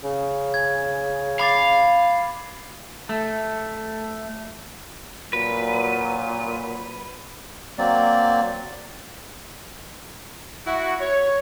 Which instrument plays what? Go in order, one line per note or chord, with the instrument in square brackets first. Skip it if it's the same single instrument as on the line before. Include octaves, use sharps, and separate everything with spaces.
[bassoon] C#3
[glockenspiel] G#6
[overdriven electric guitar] F5 [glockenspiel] B5 D6 A6
[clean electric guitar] A3
[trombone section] A#2 F#3 [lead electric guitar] B4
[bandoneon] F#3 A#3 C4 D5
[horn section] E4 F#4
C#5